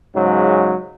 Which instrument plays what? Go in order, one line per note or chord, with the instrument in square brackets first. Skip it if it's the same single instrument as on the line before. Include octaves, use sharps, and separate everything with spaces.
[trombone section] G#2 C#3 F#3